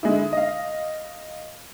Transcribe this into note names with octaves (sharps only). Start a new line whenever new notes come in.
D3 G#3 D#4 E4
D#5 F5